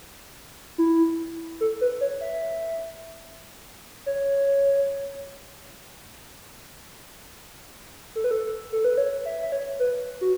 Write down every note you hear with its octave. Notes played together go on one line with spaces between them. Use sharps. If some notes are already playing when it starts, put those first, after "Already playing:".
E4
A4
B4
C#5
E5
C#5
A4
B4
A4
A4
B4
C#5
E5
E5
C#5
B4
F#4